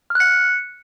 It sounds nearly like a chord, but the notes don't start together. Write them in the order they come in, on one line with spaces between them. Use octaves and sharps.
F6 F#6 C#7